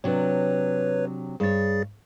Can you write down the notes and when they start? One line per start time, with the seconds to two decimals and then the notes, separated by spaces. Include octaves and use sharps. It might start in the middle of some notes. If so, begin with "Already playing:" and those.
0.04 C3 F#3 D4 B4 C#5
1.40 G2 G#4 C#5 A6